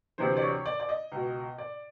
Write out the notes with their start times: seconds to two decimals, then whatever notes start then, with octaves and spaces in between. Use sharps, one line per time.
0.18 D2 C3 E3 C5
0.37 D5
0.42 C#5
0.66 D5
0.80 D5
0.89 D#5
1.12 C#2 B2
1.58 D5